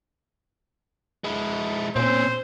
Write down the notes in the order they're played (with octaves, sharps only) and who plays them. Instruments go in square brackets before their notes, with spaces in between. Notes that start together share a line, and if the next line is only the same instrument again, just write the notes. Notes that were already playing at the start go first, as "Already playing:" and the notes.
[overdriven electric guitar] G#3 E4
[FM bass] A#2 [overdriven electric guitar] C4 C#4 [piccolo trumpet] C5